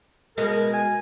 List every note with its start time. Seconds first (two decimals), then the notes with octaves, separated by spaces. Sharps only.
0.38 B2 G#3 A#4
0.73 G#5